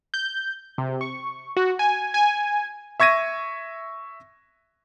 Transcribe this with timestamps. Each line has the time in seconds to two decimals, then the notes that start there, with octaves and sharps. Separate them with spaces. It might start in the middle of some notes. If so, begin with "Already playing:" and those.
0.14 G6
0.78 C3
1.01 C#6
1.57 F#4
1.79 G#5
2.14 G#5
3.00 E5 C#6 G#6 A#6 D#7